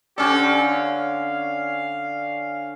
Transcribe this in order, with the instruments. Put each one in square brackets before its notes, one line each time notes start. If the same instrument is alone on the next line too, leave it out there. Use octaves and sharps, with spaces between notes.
[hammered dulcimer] D3 C#4 D5 [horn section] C4 G4 A4
[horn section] F5